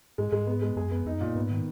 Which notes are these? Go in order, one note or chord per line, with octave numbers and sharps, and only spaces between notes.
G#2 G#3
G#2 G#3
B3
G#3
F#2 G#4
B3
F2 D#4
F#2
A#2
G#2 B3
D#3